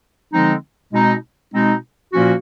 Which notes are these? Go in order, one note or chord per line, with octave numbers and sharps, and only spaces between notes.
D3 F3 G#3 C4 D#4
B2 G#3 C4 D#4
B2 G#3 C4 D#4
A#2 F3 A#3 C#4 F#4